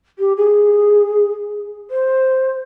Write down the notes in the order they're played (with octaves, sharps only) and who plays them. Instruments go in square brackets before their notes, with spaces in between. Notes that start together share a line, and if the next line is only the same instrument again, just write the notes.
[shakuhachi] G4
G#4
C5